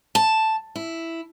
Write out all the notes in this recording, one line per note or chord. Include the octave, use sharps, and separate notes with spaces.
A5
E4